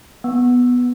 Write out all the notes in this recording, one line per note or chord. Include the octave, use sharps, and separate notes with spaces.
B3